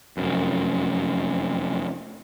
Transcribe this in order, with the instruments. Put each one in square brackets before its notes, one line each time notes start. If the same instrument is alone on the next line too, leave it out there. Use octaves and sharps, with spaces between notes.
[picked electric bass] F1 F#2